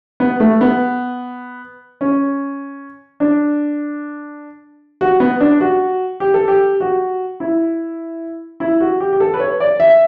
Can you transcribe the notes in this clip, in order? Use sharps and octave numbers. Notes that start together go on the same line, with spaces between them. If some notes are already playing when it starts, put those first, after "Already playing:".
B3
A3
B3
C#4
D4
F#4
B3
D4
F#4
G4
A4
G4
F#4
E4
E4
F#4
G4
G4
A4
B4
C#5
D5
E5